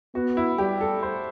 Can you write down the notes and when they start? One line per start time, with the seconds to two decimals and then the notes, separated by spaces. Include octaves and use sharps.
0.15 B3 F#4
0.37 E4
0.58 G3 G4
0.81 A4
1.03 C5